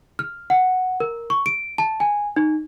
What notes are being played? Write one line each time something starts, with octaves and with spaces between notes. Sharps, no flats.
F6
F#5
A#4
C#6
D7
A5
G#5
D#4